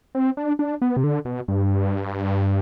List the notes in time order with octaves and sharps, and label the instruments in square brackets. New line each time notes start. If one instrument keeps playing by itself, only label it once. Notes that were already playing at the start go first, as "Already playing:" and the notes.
[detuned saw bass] C4
D4
D4
B3
C3
D3
B2
G2